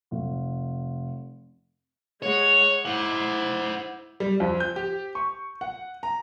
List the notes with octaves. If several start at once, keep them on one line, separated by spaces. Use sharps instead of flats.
F1
G#3 C#5 F#5
E4 C5 F#5 D6
G3
F2
G6
G4
C#6
F#5
A#5